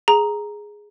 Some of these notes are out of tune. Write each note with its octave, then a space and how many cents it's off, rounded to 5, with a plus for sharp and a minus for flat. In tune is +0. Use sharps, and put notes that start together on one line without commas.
G#4 +0 A#5 +0